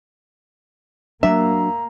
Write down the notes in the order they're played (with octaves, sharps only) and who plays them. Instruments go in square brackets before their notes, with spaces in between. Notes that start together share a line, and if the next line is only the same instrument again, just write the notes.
[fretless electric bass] F#3 D4 [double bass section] A#3 [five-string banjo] E5 [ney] A#5